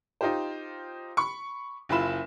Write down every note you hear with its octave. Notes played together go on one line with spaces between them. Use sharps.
D#4 F4 G4 C5
B5 C#6
F#1 E4 F4 B5 E7